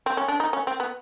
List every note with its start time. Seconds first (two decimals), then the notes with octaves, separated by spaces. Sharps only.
0.06 C4
0.17 C#4
0.28 D4
0.40 D#4
0.53 C#4
0.67 C4
0.80 B3